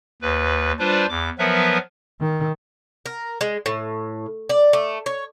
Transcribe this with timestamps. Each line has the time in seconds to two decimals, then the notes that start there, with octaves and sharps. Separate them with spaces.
0.22 D#2 B4
0.79 G3 D4 F4 B4 C5 D5
1.09 E2 D6
1.39 F3 F#3 B3 A#4 B4 E5
2.21 D#3
3.06 A#4
3.41 G#3
3.66 A2
4.49 D5
4.73 A3
5.06 C#5